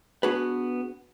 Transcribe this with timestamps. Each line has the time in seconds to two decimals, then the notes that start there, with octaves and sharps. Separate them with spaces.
0.23 B3 D4 F#4 G#4 B4